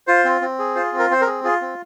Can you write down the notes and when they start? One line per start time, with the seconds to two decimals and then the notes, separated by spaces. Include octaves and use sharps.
0.07 F4 C5
0.25 C4
0.41 C4
0.59 G#4
0.76 F4 C5
0.92 C4
0.99 A#4
1.10 C4 C5
1.21 A#4
1.27 G#4
1.44 F4 G#4
1.61 C4